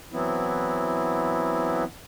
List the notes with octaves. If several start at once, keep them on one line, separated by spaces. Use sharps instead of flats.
E3 F#3 B3 C4 E4